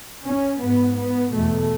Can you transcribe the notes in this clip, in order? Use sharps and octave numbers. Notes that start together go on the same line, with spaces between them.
C#4
G#2 B3
B3
E2 B2 A3